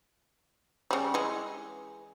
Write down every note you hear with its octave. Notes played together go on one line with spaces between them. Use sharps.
C#3 G3
E3 G#3